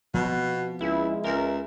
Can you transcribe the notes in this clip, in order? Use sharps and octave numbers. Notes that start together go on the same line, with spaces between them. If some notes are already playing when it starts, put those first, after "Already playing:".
B2 F3 B3 C4
C#2 G#3 E4 E5
C#2 A#4